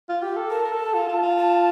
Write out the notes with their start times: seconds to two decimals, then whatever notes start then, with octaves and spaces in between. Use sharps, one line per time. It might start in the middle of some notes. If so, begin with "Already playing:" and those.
0.09 F4
0.22 G4
0.37 A4
0.50 A#4 A5
0.65 A#4
0.72 A4
0.94 F4
1.08 F4
1.23 F4
1.37 A5